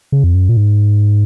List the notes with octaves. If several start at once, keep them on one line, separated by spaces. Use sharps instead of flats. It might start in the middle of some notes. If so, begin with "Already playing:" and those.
C#3
F2
F#2
A#2
G#2